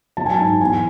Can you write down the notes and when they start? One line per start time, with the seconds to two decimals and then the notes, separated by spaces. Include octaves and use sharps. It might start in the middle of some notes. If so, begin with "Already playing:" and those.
0.17 F#3 A5
0.26 G#5
0.36 A5
0.38 G#2
0.61 E2 G#5